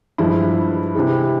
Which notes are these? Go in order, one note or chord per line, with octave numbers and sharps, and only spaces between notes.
G2 F3 G#3 E4
C3 E3 G#3